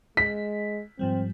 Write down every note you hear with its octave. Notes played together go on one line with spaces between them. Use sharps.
G#3 B6
G#2 F3 G3 C4